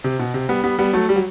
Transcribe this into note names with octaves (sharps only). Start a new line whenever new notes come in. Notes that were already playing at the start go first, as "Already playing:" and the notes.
C3
B2
C3
G3 B3
G3 B3
G3 B3
F#3 A3
G3
F#3